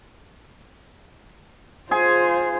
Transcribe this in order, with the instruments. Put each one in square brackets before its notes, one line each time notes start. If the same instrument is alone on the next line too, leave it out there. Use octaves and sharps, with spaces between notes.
[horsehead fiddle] F4 C5 [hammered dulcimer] G#4